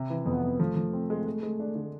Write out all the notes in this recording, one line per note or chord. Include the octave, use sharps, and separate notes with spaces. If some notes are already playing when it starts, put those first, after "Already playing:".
Already playing: C3
E3
F2 B3
F2
F3 A3
F3
C4
G#3
G#3
G#3
D4
D3